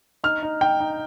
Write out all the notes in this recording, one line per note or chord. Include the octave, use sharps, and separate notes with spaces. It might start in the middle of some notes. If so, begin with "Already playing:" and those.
D#4 F6
D#4
D#4 G5
D#4